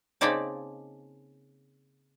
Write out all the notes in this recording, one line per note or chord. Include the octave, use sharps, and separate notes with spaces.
C#3 A#3 C4 D#4 D5 A5